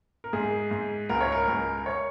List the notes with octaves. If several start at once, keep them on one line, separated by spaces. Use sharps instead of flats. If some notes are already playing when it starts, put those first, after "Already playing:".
A#4
G#2 G#4
G#2
C#2 A#4
C#5
A#4
C#2
A#4
C#5